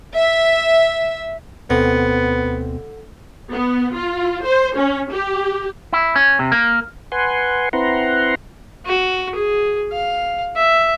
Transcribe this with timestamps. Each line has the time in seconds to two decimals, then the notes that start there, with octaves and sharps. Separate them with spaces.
0.15 E5
1.70 D2 B2 D3 B3 C4
3.52 B3
3.95 F4
4.44 C5
4.77 C#4
5.11 G4
5.93 E4
6.16 C#4
6.39 C3
6.52 A#3
7.12 B4 F#5 G#5 C6
7.73 C4 E4 B4 F#5 A#5 C6
8.86 F#4
9.35 G#4
9.92 F5
10.56 E5